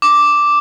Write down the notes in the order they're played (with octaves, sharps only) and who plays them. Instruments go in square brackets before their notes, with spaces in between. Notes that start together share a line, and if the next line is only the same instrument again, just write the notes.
[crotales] D6